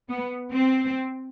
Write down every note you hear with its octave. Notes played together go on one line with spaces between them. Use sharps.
B3
C4